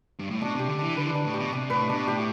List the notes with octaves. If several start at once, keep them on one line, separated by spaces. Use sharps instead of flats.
G2
A2
B2 D4
C3 G4
D3
E3 D4
D3 B4
E3
D3 D4
A2
B2 G4
C3 D4
A2 B4
B2 D4
A2 G4